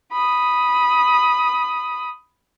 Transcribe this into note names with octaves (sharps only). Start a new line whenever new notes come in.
B5 D#6